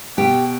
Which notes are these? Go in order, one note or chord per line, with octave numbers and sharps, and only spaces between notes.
B2 G4